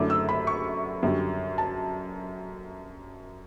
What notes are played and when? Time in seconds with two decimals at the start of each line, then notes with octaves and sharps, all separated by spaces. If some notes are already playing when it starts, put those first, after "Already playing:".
Already playing: F#2 D3 A3 E4 D6
0.10 E6
0.29 B5
0.47 C#6
1.03 F#2 D3 G3
1.58 A5